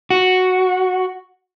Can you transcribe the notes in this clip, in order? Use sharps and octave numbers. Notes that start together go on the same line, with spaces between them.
F#4